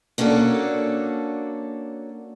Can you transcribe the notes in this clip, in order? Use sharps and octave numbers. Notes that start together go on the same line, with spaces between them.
A#3 C#4 D4 F#4 A4